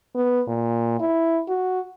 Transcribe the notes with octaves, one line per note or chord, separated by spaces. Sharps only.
B3
A#2
E4
F#4